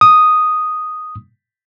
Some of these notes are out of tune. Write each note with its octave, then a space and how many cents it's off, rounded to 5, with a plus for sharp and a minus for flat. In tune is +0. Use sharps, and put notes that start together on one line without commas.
D#6 +0